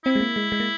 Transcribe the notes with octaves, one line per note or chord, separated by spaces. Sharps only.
C4 E4
G#3
A#3
G#3
G#3
A#3